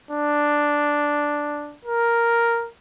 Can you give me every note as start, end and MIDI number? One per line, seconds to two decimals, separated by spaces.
0.11 1.76 62
1.85 2.68 70